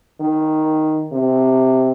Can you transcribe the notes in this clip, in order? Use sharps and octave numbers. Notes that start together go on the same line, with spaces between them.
D#3
C3